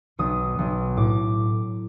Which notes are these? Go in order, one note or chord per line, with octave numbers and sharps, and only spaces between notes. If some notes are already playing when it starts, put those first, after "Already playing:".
B1 D#6
B1
A2 D6